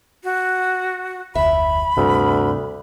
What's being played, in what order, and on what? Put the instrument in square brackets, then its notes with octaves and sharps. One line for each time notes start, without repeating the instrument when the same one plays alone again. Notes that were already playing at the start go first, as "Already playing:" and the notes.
[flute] F#4
[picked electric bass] F1 D2 [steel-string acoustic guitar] E5 [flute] B5
[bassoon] D2 [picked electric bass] G2 C3